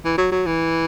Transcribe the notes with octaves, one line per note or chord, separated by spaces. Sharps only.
E3
F#3
F#3
E3